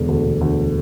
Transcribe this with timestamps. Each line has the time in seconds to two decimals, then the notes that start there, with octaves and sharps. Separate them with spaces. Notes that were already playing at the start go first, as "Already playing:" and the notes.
Already playing: E1 D3
0.08 D2
0.24 E1
0.41 D2